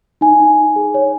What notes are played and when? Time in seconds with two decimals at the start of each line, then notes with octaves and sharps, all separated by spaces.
0.21 D#4 G#5
0.40 D#4
0.58 D#4
0.76 G#4
0.94 C#5